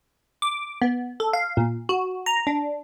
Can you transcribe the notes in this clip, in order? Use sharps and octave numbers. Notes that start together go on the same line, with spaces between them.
D6
B3
A4
F5
A#2
F#4
A#5
D4